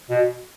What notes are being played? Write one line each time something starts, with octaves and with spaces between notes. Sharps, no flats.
B2